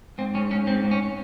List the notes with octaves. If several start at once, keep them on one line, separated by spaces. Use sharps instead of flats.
G#2 C4
G#2 C#4
G#2 C#4
G#2 C4
G#2
C#4